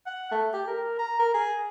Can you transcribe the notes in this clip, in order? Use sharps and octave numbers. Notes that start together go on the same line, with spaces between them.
F#5
A3
G4
A#4
A#5
A#4
G#4